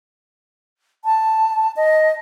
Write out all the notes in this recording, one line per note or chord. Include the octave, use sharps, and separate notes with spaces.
A5
D#5